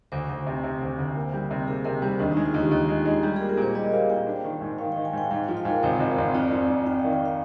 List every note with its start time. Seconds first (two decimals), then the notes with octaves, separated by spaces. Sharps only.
0.12 D2 C5
0.29 D2
0.46 C3
0.64 C3
0.81 D2
0.98 D2
1.16 A#3
1.33 G3
1.51 C3
1.68 A#3 G#4
1.85 C3 A#4
2.02 G3 C5
2.19 D#2 D4
2.32 G#3 D#4
2.45 F4
2.54 D#2 G4
2.71 D#2
2.89 G#3
3.05 G#3
3.23 G3 G4
3.36 A#3 G#4
3.49 A#4
3.57 A#2 C5
3.75 G3 D#5
3.92 A#3 F5
4.10 A#2 G5
4.27 D4
4.44 D#3
4.61 G#2
4.79 D#3 F5
4.92 D#3 G5
5.05 G#5
5.13 G#2 G5
5.31 G#2 G5
5.44 F3 G5
5.57 F5
5.65 G#2
5.70 A#4
5.83 G#1 C5
6.00 G#1
6.18 G#1
6.34 F2 D5
6.52 F2
6.70 F2
6.86 F2 G5
6.99 D#3 F5
7.13 G5
7.21 D#3 F5